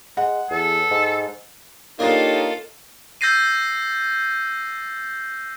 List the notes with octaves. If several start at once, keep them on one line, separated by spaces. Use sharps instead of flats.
G#3 F#5
E2 A4
G#2
A#3 D4 D#4 F4 G4 A4 C#5 D#5
E6 G6 A6 A#6 C7 D#7